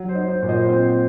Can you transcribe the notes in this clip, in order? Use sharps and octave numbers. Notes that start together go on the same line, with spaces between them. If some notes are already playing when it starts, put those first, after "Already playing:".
Already playing: F#3
C5
D#4
C5
A#2
C5 D#5
C4